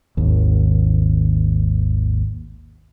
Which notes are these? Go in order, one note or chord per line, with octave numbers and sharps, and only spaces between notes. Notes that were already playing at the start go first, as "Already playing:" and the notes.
G#1 D#2